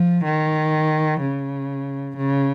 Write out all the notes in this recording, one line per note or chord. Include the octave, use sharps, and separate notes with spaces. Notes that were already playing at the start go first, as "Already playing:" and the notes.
Already playing: F3
D#3
C#3
C#3